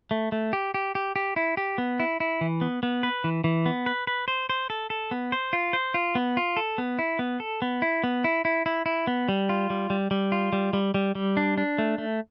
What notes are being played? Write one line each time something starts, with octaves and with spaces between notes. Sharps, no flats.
A3
A3
G4
G4
G4
G4
E4
G4
B3
E4
E4
E3
B3
B3
B4
E3
E3
B3
B4
B4
C5
C5
A4
A4
B3
C5
F4
C5
F4
B3
F4
A4
B3
E4
B3
A4
B3
E4
B3
E4
E4
E4
E4
B3
G3
F4
G3
G3
G3
F4
G3
G3
G3
G3
D4
D4
A3
A3